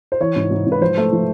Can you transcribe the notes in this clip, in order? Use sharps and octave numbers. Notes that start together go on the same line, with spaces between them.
C5
E3 C#5
G#2
G#2
G#2
B4
F3 C5
A3
F3